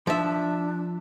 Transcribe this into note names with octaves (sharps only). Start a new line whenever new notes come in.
F3 D4 E5